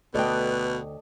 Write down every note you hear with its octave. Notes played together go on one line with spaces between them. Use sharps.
D2 B2 A4 B4 D5 D#5 G5